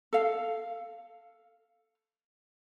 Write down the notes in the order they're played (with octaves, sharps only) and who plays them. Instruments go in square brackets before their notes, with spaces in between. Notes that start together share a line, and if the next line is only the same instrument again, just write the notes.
[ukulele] A4 F5